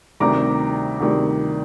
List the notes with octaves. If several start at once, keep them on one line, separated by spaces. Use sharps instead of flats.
D2 C3 D#3 G3 A#5 D6
D2 C3 D#3 G3